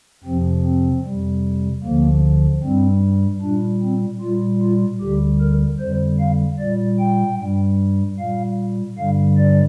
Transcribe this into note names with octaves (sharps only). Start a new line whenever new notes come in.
F2 C3 F3 C4
C4
F2 C3 G3
D2 D3 F3 A#3
G2 G3 C4
A#2 G3 D4
C4
A#2 G3 F4
F4
D2 D3 G3 G4
A#4
F2 D3 G3 C5
F5
A#2 G3 D5
G5
G2 G3
A#2 G3 F5
G2 D3 G3 F5
D5